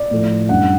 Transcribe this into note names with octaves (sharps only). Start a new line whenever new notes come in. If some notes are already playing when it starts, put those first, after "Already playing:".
Already playing: D5
A2 F3 A3
F#2 D3 G3 F#5